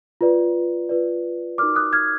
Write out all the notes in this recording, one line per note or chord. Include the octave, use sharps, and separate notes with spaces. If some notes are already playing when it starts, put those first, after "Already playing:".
F4 B4 D5
F4 B4 D5
D#4 F#4 A#4 D5 D6 F6
D#6 F#6
F6 G#6